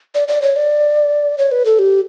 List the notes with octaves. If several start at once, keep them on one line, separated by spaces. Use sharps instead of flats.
D5
D5
C#5
D5
C#5
B4
A4
G4